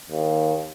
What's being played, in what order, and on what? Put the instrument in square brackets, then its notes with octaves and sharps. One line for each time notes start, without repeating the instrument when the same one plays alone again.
[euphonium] D#2